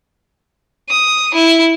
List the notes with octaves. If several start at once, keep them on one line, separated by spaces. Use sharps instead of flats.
D#6
E4